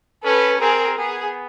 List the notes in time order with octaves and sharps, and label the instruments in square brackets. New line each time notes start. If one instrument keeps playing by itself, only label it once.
[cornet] C#4 [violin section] A4 B4
[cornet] C4 [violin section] G#4 A#4
[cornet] B3 [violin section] G#4